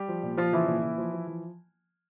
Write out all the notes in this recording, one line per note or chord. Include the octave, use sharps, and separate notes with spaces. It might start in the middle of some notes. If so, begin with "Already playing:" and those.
Already playing: G3 G4
F3
A#2
F3 F4
C#3 E3 E4
A#2
A#2
F3
F3
E3